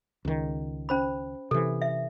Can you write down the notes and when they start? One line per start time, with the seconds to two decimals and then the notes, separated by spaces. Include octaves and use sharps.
0.25 C#2 D#3
0.89 C#4 C5 B5
1.51 C3 E3 A4
1.82 E5